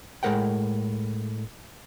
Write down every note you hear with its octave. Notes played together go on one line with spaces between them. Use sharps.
A2 G#3 C4 A#4 F#5 G5